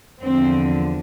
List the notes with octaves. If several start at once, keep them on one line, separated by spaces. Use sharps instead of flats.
E2 D3 F3 C4